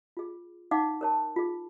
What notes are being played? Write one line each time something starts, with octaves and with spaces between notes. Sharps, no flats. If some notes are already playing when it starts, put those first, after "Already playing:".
F4 G#4
D#4 F5 F#5 D6
A#4 C#5 A5
F4 G#4